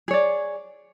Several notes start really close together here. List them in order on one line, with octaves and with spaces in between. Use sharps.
G#4 C#5 D5